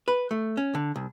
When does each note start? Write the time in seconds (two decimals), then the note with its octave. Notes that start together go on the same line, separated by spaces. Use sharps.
0.08 B4
0.31 A3
0.57 C#4
0.75 D3
0.96 C2